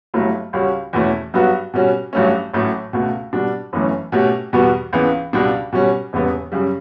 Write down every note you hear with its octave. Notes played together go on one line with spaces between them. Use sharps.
G1 G2 F#3 A3 E4
C#2 C#3 G3 C#4 F#4
E2 B2 A3 C#4 E4
G2 F#3 B3 F#4
B2 G3 C#4 F#4
A1 G2 F#3 A3 C#4
A1 A2 F#3 A3 C#4
C#2 B2 A3
B2 G3 D4
G1 F#2 E3 A3 C#4
B2 A3 C#4 G4
E2 B2 G3 B3 F#4
C#2 C#3 E3 B3
C#2 B2 G3 D4
B2 G3 C#4
E1 E2 C#3 G3 B3
F#2 C#3 G3